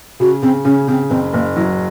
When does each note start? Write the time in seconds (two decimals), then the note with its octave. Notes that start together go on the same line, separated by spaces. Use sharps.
0.20 C#3 F#4
0.43 C#3 C4
0.65 C#3 C#4
0.88 C#3 C4
1.10 F#1 C4
1.33 F#1 A#3
1.56 F#3 E4